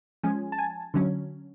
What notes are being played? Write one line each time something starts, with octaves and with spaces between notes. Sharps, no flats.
F3 G#3 C#4 G#5
A5
G#5
D3 F#3 C#4